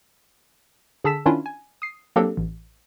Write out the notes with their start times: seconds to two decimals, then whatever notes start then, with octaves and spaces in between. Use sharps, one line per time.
1.04 D3 G#4 A5 E6 B6 E7
1.26 D#3 C#4 D4 E4 F4
1.46 G#5
1.82 D#6 C7
2.16 F#3 A#3 C4 D4 G4 A4
2.37 A1